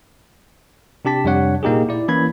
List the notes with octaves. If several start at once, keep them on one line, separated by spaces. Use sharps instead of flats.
C3 D4 G4 A5 B6
F2 C3 G3 D4 C#5 F#5
A#2 A#3 D#4 G4 G#4
E4 D5
E3 A#3 C#4 B5 G#6